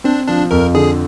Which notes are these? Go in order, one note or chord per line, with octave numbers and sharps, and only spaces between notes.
C4 D4
F3 D4
F2 A#4
D3 G#4